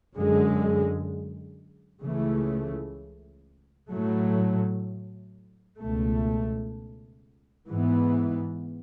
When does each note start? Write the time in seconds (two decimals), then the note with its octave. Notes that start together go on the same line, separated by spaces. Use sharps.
0.15 F#2 D3 G#3
2.03 C#2 C#3 E3 A3
3.91 A2 F#3 A3
5.79 C#2 B2 A3
7.67 G#2 E3 B3